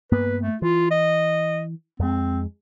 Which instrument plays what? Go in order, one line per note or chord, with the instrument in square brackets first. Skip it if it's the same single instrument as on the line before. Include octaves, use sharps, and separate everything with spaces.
[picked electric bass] G2 A#3 B3 [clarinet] B4
[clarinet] A3
[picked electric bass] E3 [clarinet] F4
[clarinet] D#5
[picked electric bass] F2 G#3 [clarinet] C4